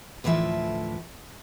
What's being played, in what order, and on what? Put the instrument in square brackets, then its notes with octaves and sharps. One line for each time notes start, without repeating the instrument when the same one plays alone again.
[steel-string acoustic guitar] D2 A2 E3 F3 E5